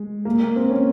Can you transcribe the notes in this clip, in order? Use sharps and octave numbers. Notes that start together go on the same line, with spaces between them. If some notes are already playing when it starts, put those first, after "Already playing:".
Already playing: G#3
A#3
A#3
C4
C#4